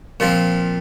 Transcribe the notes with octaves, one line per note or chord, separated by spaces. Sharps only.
A#2 F3 C4